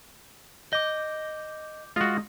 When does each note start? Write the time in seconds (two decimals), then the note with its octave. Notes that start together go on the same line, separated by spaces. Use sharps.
0.73 D#5 D6 G6
1.96 G#3 F4 F#4 D#6 A#6